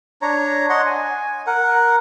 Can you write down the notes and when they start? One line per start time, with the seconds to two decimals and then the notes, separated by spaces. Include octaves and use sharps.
0.22 D4 C#5 A#5
0.70 C#5 D#5 F#5 C6
0.86 G#5
1.47 A#4 F#5